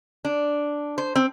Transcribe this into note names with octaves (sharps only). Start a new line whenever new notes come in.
D4
C5
C4